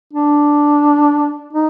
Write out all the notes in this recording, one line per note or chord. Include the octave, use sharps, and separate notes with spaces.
D4
D#4